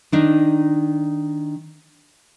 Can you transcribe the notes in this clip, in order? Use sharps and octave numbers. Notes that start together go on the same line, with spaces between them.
D#3 D4 D#4